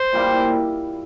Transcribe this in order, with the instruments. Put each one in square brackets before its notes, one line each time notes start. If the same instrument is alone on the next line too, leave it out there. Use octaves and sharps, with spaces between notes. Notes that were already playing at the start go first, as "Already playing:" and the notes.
Already playing: [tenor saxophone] C5
[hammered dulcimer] A#2 G3 A#3 E4